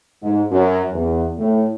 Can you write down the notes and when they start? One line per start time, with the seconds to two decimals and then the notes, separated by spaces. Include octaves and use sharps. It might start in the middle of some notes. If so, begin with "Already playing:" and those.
0.22 G#2
0.51 F#2
0.92 E2
1.38 A2